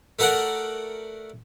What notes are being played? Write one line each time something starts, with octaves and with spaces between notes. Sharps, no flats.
A3 F#4 A#4 D5 F#5